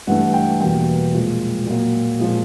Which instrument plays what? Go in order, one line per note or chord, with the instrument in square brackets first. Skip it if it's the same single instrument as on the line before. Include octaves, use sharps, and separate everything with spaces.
[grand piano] G2 E3 A3 F#5
G5
E2 B2 G3 A#3 G5
A#2 F3 G#3
A#2 F#3 A#3
A#2 F3 G#3